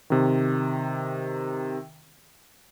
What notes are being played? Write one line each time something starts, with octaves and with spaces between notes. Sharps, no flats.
C3 D#3